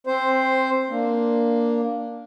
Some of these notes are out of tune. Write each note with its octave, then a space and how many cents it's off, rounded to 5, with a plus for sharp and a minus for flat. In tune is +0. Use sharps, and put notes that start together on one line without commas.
C4 +10 C5 +0
A#3 +0 D4 -5